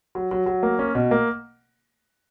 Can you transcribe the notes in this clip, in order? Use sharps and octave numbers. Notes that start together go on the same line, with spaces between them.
F#3
F#3
F#3
A#3
C#4
B2
A#3